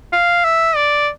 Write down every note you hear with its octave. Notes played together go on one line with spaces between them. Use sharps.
F5
E5
D5